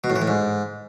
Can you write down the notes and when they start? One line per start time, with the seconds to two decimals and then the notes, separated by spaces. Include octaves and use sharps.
0.04 B2
0.10 A2
0.16 E3
0.22 A2
0.28 G#2